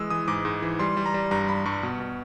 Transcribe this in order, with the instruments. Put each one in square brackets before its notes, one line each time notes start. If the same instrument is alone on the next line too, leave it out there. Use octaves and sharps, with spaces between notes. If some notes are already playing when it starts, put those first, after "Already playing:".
Already playing: [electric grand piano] E3 G#3 D#6 E6
E3 D#6
G#2 D6
G#2
E3
G3 C6
G3
A#5
G3
G2 A#5
G2 B5
G2 C#6
B2
B2